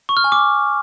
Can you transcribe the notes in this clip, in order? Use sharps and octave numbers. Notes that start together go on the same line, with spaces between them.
C#6
F6
G#5
D6